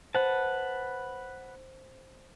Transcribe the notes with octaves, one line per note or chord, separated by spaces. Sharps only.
B4 C5 F#5 A5